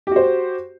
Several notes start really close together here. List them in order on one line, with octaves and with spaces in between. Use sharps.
G4 F#4 C5